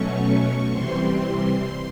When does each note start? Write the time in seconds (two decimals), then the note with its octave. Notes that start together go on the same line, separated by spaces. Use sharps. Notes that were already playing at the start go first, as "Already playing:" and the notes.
Already playing: B2 F#3 A3 C#4 C#6
0.72 C3 E3 G3 C4 C6